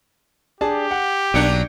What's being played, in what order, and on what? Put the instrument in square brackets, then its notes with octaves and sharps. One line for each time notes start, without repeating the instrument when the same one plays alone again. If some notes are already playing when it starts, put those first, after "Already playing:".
[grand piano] D4 G#4 A5 [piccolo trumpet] G4
[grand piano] F#5
[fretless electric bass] B1 [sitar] F#3 A#3 D4 [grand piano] G6 C#7 D7